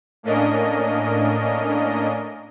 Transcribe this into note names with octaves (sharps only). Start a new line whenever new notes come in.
A2 A#3 C#4 D4 A#4 D#5